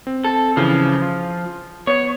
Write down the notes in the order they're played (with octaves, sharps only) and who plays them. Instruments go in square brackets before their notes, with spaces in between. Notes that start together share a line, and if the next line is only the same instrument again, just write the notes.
[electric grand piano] C4
[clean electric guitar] A4
[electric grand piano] C#3 E3 [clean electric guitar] F3
[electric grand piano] F4
[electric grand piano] B3 [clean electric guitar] C#5